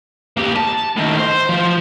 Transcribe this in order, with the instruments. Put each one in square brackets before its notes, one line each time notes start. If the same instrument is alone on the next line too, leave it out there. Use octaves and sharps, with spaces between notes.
[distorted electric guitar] A#3 G4
A5
A2 D#3
C5
F3